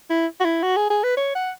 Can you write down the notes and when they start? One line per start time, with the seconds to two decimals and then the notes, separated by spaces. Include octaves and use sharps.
0.10 E4
0.41 F#4
0.45 E4
0.63 F#4
0.77 G#4
0.90 G#4
1.04 B4
1.17 C#5
1.35 F#5